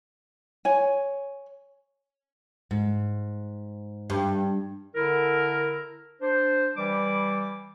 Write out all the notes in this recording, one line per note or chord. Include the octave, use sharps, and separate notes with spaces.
C#5 G#5
G#2
G2
D3 E4 A#4
D4 C5
E3 G3 D6